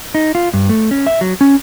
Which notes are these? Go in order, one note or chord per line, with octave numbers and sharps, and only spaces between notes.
D#4
F4
G2
A3
C#4
E5
F#3
C#4